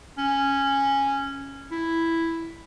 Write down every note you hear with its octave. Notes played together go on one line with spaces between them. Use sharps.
C#4
E4